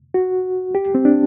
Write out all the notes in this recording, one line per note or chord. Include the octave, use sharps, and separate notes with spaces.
F#4
G4
C4
D4